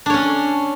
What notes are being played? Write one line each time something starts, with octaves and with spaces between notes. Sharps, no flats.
C#4 D4 C#5